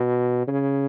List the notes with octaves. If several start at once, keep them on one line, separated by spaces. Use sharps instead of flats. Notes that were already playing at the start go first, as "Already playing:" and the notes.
Already playing: B2
C#3